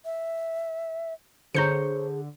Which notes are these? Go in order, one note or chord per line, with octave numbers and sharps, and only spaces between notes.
E5
D3 G#4 C5 C#5 A#5 G6 C#7